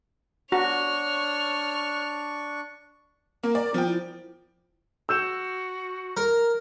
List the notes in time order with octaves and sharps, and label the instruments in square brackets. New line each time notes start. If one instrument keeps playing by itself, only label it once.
[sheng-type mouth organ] D4 C#6 [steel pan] F#4 [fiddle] C#5 F6
[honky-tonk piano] A#3 [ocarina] A#4
[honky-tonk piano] D5
[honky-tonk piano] F3 G5 [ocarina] B3
[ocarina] E4
[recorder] F#4 [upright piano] E6 G6 E7
[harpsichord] A#4